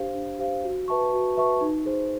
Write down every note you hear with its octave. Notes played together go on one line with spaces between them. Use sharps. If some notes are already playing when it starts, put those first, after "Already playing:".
Already playing: D4 G4 C5 F5
D4
G4 C5 F5
F#4
B4 E5 A5 C#6
F#4
B4 E5 A5 C#6
D#4
G#4 C5